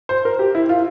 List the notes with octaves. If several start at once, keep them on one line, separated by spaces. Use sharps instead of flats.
C5
A#4
G4
E4
F4